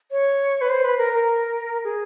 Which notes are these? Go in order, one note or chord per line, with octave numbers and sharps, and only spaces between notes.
C#5
B4
C5
B4
A#4
A#4
G#4